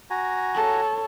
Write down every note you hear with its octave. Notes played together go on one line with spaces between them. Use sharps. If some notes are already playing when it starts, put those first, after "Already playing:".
F#4 G#5 A#5
A4 C#5